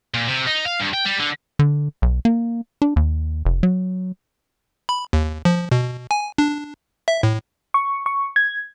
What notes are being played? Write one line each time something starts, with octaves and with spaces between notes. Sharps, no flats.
A#2
C3
D#4
F5
G2
G5
G3
D3
D3
B1
A#3
D4
D#2
F1
F#3
B5
D#2
F3
B2
G#5
D4
E5
A2
C#6
C#6
G#6